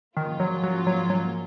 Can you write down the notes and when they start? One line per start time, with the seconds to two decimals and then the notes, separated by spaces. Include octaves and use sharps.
0.17 G#2 D#3 F3 A#3 C#4 F4
0.40 F#3
0.63 F#3
0.87 F#3
1.10 F#3